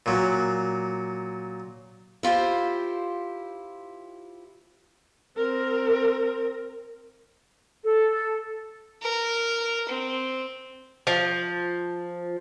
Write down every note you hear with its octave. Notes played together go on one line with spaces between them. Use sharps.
A#2 F#3
E4 F4 G4 C5
C4 A#4
A4
A#4
C4
F3